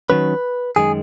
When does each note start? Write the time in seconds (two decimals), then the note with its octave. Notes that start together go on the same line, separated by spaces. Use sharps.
0.10 D#3 F#3 C#4 B4
0.76 F#2 D#3 G#3 G#4